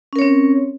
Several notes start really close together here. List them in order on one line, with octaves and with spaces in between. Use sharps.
C#4 A#4 C#5 C4